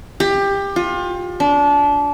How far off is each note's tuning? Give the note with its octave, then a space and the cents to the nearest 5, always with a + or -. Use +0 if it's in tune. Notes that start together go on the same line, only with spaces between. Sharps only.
G4 +20
F4 +30
D4 -25